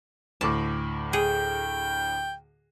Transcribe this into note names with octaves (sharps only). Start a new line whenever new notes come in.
D2 A2 A5 D6
G#4 G5